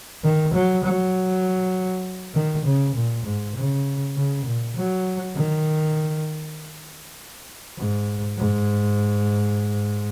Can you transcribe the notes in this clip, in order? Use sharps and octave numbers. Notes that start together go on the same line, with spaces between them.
D#3
F#3
F#3
D#3
C#3
A#2
G#2
C#3
C#3
A#2
F#3
D#3
G#2
G#2